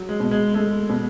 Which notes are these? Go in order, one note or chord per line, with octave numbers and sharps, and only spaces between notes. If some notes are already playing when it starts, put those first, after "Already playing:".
Already playing: F#3
G#3
B2
G#3
G#3 A3
B2